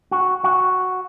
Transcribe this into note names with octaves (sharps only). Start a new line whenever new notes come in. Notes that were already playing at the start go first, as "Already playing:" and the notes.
F#4
F#4